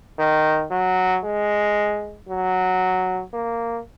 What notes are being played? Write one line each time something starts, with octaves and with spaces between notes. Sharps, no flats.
D#3
F#3
G#3
F#3
A#3